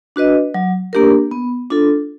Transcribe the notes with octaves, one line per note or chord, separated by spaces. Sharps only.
D4 F#4 B4 D#5
F#3
A#3 D4 G4 A#4
B3
D4 F4 A4